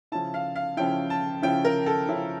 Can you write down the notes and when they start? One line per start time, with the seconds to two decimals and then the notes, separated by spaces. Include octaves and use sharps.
0.12 C#3 F3 C#4 E4 A5
0.34 F5
0.56 F5
0.77 C#3 F3 C#4 E4 G5
1.10 A5
1.42 C#3 F3 C#4 E4 G5
1.64 A#4
1.86 A4
2.08 C#3 F3 C#4 E4